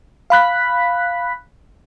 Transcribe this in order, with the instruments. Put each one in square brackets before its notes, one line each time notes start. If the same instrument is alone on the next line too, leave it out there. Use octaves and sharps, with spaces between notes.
[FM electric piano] F5 B5 F#6 B6